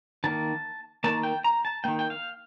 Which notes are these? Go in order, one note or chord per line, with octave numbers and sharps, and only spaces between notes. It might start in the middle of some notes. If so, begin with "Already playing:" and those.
D#3 A#3 A5
D#3 A#3 A5
G5
A#5
A5
D#3 A#3 G5
G5
F5